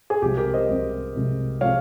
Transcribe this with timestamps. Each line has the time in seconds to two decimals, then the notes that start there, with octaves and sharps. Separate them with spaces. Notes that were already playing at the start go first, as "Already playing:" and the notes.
0.10 G#4
0.22 C2 C3 F3 G#3 G4
0.37 G4 A#4
0.53 C5 D#5
0.68 C2 C3 F3 G#3
1.15 C2 C3 F3 G#3
1.61 C3 F3 G#3 C#5 F5